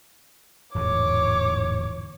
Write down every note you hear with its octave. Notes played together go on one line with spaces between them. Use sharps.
D1 E2 G#2 C#5 D6